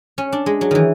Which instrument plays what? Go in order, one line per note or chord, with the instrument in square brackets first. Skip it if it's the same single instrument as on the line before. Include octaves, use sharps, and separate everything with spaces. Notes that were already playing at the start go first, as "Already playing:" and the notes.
[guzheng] C#4
D4
G#3
F#3
D#3 E3